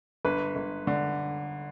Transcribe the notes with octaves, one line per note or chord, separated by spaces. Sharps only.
G1 B4
G1
D3